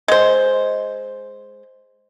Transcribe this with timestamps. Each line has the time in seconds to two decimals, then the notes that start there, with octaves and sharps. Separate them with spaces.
0.08 G#3 C5